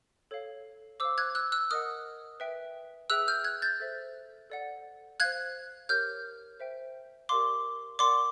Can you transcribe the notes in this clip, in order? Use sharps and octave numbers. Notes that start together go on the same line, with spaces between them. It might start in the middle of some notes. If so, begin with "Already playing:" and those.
A4 C#5 F5
C5 F5 D6 E6
F#6 G#6
E6 F#6
E6 F#6
A#4 D#5 F#5 D#6 F6
B4 E5 G5
G#4 B4 E5 G5 E6 F#6
F6 G6
F#6 G#6
G6 A6
A4 C5 E5
A4 D5 F#5
C5 F5 F#6 G#6
G4 A#4 C#5 F6 G6
C5 E5 G5
G4 A#4 D5 F5 C6 D6
A#4 D5 F#5 C6 D6